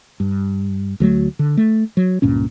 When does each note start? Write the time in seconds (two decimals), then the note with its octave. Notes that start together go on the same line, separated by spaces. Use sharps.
0.20 G2
1.00 D2 F#3 A3
1.39 D3
1.57 A3
1.97 F#3
2.22 C#2 G2 A#2 C#4